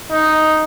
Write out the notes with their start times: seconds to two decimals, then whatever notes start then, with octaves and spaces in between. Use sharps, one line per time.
0.11 D#4